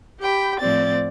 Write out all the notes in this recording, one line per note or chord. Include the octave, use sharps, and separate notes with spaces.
G4 G5 B5
A2 F3 C4 D5 A6